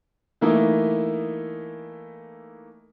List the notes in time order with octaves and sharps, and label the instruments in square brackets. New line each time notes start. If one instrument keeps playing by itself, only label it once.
[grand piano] E3 A3 A#3 D#4 E4